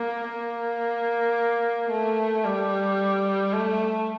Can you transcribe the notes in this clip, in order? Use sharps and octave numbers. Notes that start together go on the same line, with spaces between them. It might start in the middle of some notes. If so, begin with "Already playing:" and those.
Already playing: A#3
A#3
A3
G3
A3